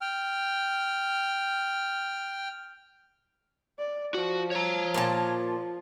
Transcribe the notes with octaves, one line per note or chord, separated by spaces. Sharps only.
G5 F6
D5
F3 F#4
C#5 A#5
A#2 F4 A5